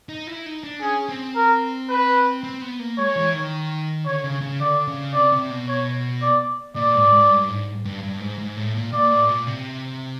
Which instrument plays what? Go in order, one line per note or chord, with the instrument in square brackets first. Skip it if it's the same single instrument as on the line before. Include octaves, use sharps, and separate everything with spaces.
[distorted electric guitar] D#4
E4
D#4
D4
[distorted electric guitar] C#4 [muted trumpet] G#4
[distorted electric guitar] C4
[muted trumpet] A#4
B4
[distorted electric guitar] C4
B3
A#3
[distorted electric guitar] G#3 [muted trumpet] C#5
[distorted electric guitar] E3
D#3
[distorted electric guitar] D3 [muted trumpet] C#5
[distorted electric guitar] C#3
C#3
[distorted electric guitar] D3 [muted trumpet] D5
[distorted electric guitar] C#3
[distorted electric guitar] C3 [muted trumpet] D5
[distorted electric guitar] C3
B2
[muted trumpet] C#5
D5
[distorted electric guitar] A#2 [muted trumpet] D5
[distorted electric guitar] G#2
G#2
G2
G#2
G2
G2
G#2
G#2
A2
A#2
[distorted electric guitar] A#2 [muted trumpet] D5
[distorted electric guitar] A2
A#2
C3